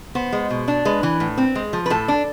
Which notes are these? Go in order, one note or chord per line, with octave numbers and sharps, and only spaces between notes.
B3 C5
G#3
B2
D4
G#3 B4
E3
A2
C4
G#3
F3
B4
A2 A4
D4